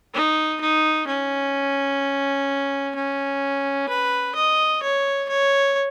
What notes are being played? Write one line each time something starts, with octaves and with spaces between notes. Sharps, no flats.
D#4
D#4
C#4
C#4
B4
D#5
C#5
C#5